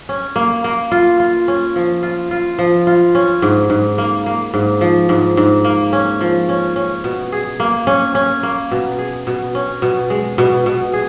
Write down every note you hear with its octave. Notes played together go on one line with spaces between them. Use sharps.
C#4
A#3
A#3
F4
F4
C#4
F3
F4
F4
F3
F4
C#4
G#2
G#2
A#3
A#3
G#2
F3
G#2
G#2
A#3
C#4
F3
C#4
C#4
B2
G#4
A#3
C#4
C#4
A#3
B2
G#4
B2
C#4
B2
G#3
B2
B2
G#4